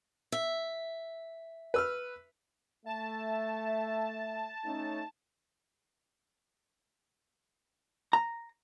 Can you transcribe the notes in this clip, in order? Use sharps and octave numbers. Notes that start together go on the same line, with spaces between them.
E5
B4 E6 F6
A3 E5 A5
A3 C#4 D#4
A#5